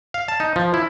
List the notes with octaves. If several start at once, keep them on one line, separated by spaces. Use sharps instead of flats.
F5
A5
D#4
F3
E4